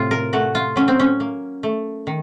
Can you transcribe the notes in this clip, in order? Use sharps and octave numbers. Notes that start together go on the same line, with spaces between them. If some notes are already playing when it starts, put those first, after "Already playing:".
Already playing: A2 C3 F4
A#4
A3 F#4
F4
F#3 C#4
C4
C#4
A#3
A3
D#3